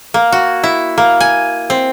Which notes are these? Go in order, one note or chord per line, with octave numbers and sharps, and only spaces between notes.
A#3
F#4
E4
A#3
G#5
C4